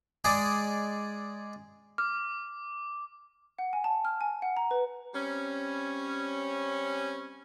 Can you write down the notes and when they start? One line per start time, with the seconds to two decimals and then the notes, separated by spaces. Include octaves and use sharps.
0.24 G#3 G#4 D5
1.98 D6 F6
3.59 F#5
3.73 G#5
3.84 A5
4.05 F6
4.21 G#5
4.42 F#5
4.57 A#5
4.71 B4
5.14 G3 C4 C#4